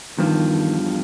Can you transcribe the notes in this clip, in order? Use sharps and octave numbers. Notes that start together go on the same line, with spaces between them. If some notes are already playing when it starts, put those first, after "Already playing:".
E2 G2 D#3 F3